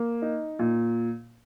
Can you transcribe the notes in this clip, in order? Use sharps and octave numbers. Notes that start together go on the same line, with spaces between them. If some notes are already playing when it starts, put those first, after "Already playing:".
Already playing: A#3
D#4
A#2